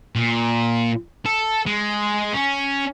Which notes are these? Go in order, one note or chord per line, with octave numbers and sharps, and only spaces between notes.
A#2
A4
G#3
C#4